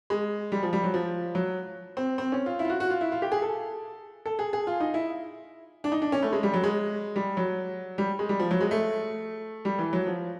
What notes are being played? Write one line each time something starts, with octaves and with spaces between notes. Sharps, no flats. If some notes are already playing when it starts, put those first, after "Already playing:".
G#3
G3
F3
G3
F#3
F3
F#3
C4
C4
C#4
F4
E4
F4
F#4
F#4
F4
E4
F4
G4
G#4
A4
A4
G#4
G#4
F4
D#4
E4
D4
D#4
D4
C#4
A3
G#3
G3
F#3
G#3
G3
F#3
G3
G#3
G3
F3
F#3
G#3
A3
G3
E3
F#3
F3